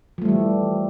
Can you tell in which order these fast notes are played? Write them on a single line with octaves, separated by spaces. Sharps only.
F3 A3 G3 E3